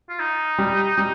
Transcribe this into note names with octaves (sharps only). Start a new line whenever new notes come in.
F4
D#4
G3
G3 D#4